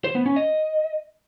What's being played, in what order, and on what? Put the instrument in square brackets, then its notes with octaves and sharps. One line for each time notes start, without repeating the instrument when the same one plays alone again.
[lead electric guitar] C5
B3
C#4
D#5